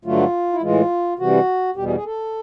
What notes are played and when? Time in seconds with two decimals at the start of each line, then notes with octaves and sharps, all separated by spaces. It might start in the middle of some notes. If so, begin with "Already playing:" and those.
0.05 G2 D3 F#3 A3 F4
0.53 E4
0.61 A2 E3 G#3 F4
1.19 C3 E3 G3 F#4
1.76 E2 B2 G3 G4
1.85 G#4
1.96 G#4
2.05 A4